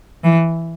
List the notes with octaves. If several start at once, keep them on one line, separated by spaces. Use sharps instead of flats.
E3